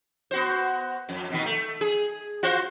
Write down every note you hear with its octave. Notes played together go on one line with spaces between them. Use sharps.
B3 F#4 C5
F2
B2 D#3 B3
A3
G#4
F4 F#4 C5